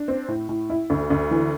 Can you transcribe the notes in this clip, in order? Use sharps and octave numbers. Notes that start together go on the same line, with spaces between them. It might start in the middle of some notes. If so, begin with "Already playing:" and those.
Already playing: D4
C4
A2
A2
E4
D2
D2
E3